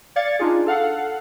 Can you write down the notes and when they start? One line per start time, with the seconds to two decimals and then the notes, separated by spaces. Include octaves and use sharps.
0.16 D5 F5 G#6 A6 C#7
0.39 D4 D#4 F4 G#4
0.66 A4 F5 F#5